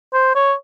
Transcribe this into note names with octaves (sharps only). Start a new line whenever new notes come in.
C5
C#5